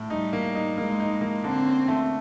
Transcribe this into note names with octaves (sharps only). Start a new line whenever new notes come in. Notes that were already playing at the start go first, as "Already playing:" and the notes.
Already playing: A2
G3 D#4
A#3
D#4
G#3 A#3
D#4
A#3
D3 C4
C#4
A3